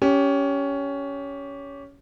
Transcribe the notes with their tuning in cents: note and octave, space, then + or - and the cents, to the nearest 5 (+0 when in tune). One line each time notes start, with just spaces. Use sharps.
C#4 +15 G4 +0